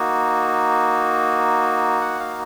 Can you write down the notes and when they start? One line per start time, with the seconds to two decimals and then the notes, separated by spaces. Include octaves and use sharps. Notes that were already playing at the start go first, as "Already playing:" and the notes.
Already playing: A#3 D#4 F#4
2.01 F#5
2.20 F5